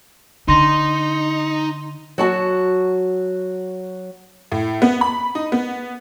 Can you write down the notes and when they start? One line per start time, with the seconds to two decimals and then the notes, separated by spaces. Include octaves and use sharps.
0.48 D3 D#4 C6 A#6
2.18 F#3 F#4 A5
4.52 A2
4.82 B3
5.01 B5
5.35 D#4
5.52 B3